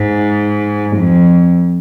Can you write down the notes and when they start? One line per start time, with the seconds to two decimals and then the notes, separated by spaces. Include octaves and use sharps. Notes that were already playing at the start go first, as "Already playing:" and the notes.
Already playing: G#2
0.97 F2